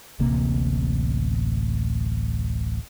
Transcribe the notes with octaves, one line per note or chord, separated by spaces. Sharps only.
D1 A1 C3 A#3